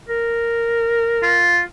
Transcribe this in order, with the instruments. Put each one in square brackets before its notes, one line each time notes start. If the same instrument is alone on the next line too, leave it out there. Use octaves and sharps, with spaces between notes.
[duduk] A#4
[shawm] F4